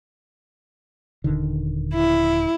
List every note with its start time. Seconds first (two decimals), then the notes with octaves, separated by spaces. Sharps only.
1.24 D#1 D3 D#3
1.94 E4